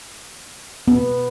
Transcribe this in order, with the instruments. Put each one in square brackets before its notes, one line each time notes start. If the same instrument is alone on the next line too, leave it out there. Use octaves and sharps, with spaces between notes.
[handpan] B3